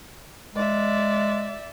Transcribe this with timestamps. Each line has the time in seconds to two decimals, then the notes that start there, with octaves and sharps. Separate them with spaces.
0.56 G#3 D5 E5